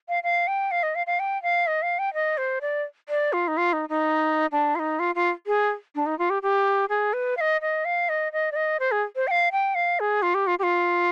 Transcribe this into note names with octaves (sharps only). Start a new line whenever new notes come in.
F5
F5
G5
F5
D#5
F5
F5
G5
F5
D#5
F5
G5
D#5
C5
D5
D5
F4
D#4
F4
D#4
D#4
D4
F4
D#4
F4
F4
G#4
D4
D#4
F4
G4
G4
G#4
B4
F5
D#5
D#5
F5
D#5
D#5
D5
D#5
C5
G#4
C5
G5
F5
G5
F5
G#4
F4
G4
F4
G4
F4